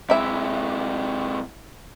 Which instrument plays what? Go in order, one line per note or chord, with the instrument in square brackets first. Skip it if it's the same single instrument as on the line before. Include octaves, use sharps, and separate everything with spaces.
[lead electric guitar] C3 G#3 [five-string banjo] E4 E5